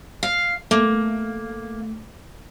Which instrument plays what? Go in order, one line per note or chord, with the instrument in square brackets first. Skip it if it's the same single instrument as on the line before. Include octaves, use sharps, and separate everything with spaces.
[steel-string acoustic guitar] F5
[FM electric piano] A3 [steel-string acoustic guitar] A#3